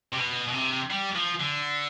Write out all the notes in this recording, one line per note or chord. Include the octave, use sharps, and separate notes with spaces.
C3
B2
B2
C3
G3
F3
D3